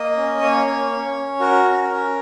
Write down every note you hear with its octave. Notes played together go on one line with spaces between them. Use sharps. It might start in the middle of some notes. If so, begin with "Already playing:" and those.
Already playing: A#3 D#5
C#4
A#3 C#5
C#4
C#4
C#4
F#4 A#4
C#4
C#4